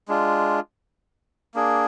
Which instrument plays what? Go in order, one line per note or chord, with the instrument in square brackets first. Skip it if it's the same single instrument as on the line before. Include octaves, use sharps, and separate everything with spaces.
[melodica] G#3 D4 F4
A#3 D4 G#4